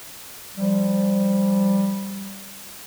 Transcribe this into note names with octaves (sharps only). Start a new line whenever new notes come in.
F3 G3